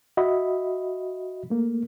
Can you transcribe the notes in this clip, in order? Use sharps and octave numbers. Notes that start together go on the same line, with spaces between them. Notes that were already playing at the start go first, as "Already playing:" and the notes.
F#4 D#5 E5 B5
A3 A#3